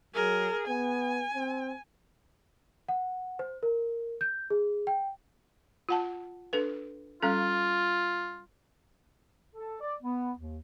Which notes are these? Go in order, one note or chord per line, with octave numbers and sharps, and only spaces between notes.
F#3 G#4 A#4
B3 G#5
C4
F#5
C5
A#4
G6
G#4
G5
F4 F#5 A5
D4 A4 B4
G3 C#4 F4 A4
A4
D5
B3
D#2